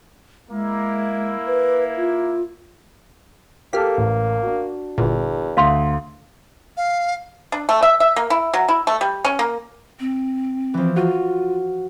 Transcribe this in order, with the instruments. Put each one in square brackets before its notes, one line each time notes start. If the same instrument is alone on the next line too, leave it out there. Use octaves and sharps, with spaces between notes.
[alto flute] G#3 [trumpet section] A#3 E4
[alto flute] B4
F4
[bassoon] A#3 [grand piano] G4 A4 [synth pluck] F6 B6
[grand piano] A1
D4 F#4
[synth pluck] G1 A#2 [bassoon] E2
[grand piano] D2 [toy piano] F5 C6
[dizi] F5
[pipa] D4
A3
E5
E5
A#3
E4
F#3
E4
A3
G3
C#4
A#3
[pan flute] C4
[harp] E3 F3
[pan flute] F4 [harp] F#4 F5